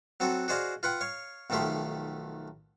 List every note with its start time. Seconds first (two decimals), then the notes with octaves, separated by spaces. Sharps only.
0.20 F#3 C4 F#4 A4
0.48 F#4 G#4 C5 D5 D#5 F5
0.83 F4 B4 F#5 G5
1.01 C#5 F5
1.50 B1 D#3 F3 A3 G4 C6